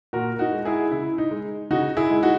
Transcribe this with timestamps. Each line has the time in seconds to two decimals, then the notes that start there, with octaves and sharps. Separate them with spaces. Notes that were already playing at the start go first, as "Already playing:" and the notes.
0.13 A#2 F#4 A#4
0.39 D#4 F#4
0.53 G#3
0.65 E4 G#4
0.92 C#3 E4
1.18 D#4
1.31 G#3
1.70 C#3 D#4 F#4
1.97 E4 G#4
2.10 G#3
2.22 D#4 F#4